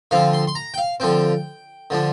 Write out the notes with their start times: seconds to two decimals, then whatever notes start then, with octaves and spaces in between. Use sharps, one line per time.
0.11 D3 F3 C4 F5
0.33 C6
0.47 C6
0.55 A#5
0.74 G5
0.78 F5
1.00 D3 F3 C4 G5
1.90 D3 F3 D4